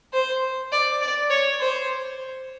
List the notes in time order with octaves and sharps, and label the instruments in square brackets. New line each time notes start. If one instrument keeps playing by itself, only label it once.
[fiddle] C5
D5
D5
C#5
C5